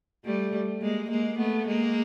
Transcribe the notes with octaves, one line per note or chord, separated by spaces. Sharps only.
G3 A3
G#3 A#3
G#3 A#3
A3 B3
G#3 A#3